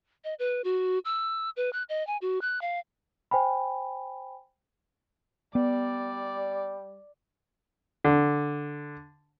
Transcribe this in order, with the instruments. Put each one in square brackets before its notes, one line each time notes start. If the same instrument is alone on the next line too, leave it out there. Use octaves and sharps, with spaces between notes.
[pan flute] D#5
B4
F#4
E6
B4
F#6
D#5
G#5
F#4
F#6
F5
[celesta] C5 G5 G#5 B5
[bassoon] G3 [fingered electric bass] B3 [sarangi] D5
[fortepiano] D3